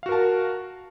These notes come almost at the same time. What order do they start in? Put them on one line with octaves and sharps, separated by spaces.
F5 F#4 A#4 A5